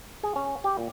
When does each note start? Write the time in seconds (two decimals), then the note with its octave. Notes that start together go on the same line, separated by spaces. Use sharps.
0.23 G#4
0.36 C#4
0.64 G4
0.78 A#2